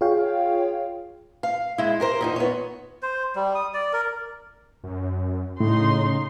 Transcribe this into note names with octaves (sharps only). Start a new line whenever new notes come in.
F4 G#4 C#5 F5 G5
F5
G#3 E4
G4 A#4 C5
E2 A#2 D#4
B3 C#5
C5
G3
D#6
D5
A#4
F#2
A2 C#3 D#4 C6